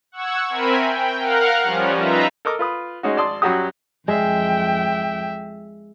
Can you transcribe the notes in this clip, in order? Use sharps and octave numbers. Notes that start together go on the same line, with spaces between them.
F#5 C#6 E6 G#6
C4 A#4 E5 G#5 B5
G5
A#4 F5 F#5 F6 F#6
F3 G3 C#4
D#4 F4 B4 E5 A#5
A4 A#4 D#5 D6
F4 B4 D#6
G#3 C#4 D#4 F#4
G#1 D5 A5 C6 D#6
F#2 F#3 G3 F#4 G4 D#6
F2 G#3 E5 G5